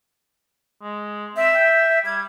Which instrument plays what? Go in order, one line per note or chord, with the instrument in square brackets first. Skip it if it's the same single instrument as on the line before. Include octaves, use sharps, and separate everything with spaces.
[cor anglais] G#3
[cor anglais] C4 [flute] E5
[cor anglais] G5
[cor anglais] G3 [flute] G#6